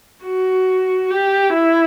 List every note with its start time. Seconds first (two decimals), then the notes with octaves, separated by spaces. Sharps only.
0.24 F#4
1.10 G4
1.53 E4